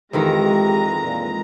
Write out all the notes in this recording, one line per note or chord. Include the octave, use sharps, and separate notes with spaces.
F2 D#3 E3 G#3 G4 A#5
A#2